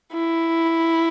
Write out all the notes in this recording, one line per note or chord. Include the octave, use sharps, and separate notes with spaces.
E4